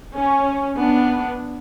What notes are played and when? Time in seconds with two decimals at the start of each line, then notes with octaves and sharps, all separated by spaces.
0.16 C#4
0.79 B3 D4